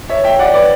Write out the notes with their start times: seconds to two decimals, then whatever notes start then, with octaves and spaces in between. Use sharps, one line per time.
0.09 C#5 E5
0.24 E5 G5
0.39 D5 F#5
0.54 B4 D5